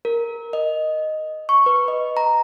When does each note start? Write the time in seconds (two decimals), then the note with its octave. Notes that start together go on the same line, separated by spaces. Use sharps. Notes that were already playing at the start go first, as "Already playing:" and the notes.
0.05 A#4
0.53 D#5
1.49 C#6
1.66 B4
1.88 D#5
2.17 A#5